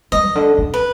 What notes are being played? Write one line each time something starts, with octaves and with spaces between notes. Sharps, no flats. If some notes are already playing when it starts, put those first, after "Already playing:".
G#3 D#5
C#3
D3
C#3
B4